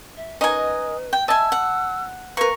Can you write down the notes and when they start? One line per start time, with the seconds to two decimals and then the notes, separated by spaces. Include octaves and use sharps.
0.17 E5
0.41 C#4 D#4 A#4 B4 D#5 G#5
1.13 G5
1.28 D#5 E5 G#5 A5 E6
1.52 F#5
2.37 A#3 A#4 B4 C#6